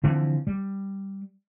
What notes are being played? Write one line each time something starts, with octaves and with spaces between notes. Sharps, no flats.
D3 E3 F3 C4
G3